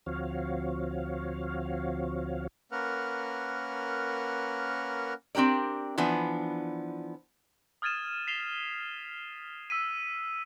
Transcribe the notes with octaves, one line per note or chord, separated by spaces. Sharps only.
D2 F3 C4 F#4 C#5 F5
A#3 C#4 A#4 B4 F#5 F6
C4 D4 G4 A#4 D5
E3 F3 B3 D4
D#6 F6 G#6 A6 D#7 E7
B6 C7 E7 F7 G7
E6 B6 D#7